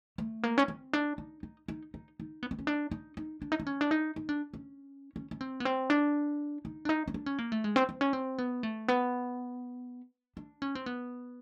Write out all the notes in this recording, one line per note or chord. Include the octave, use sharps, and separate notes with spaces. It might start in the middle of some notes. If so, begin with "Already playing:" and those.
A3
A#3
C#4
C4
D4
D#4
D#4
D#4
D#4
D#4
B3
C4
C#4
D4
D#4
D#4
D4
D#4
D4
C#4
D4
D#4
D#4
D4
C#4
C#4
C#4
C4
B3
C4
D4
D#4
D4
D#4
C#4
D4
C#4
A#3
A3
G#3
C4
C4
C#4
C4
B3
A3
B3
D4
C#4
C4
B3